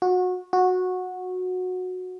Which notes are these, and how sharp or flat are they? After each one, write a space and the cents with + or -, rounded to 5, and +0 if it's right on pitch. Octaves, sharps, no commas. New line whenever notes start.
F#4 -25
F#4 -15